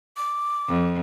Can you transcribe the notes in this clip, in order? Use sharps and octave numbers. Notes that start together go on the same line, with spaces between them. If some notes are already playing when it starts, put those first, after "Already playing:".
D6
F2